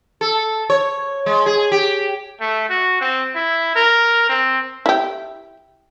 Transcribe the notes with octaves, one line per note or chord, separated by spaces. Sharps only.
A4
C#5
G#3
G#4
G4
A3
F#4
C4
E4
A#4
C4
E4 G4